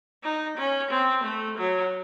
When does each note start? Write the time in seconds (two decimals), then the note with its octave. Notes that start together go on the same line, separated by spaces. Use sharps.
0.23 D#4
0.57 C#4
0.90 C4
1.24 A3
1.57 F#3